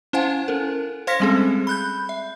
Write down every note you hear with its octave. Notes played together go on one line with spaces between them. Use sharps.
C#4 E4 C5 F5 F#5 G#5
C#4 A4 A#4
C5 F5 C6 F6 A#6 B6
G3 G#3 C4 C#4 G#4 A4
B5 F#6 G6
E5